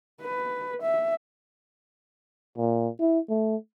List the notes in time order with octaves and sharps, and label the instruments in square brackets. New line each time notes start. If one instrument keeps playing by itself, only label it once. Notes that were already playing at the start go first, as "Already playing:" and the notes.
[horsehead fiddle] B4
E5
[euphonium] A#2
E4
A3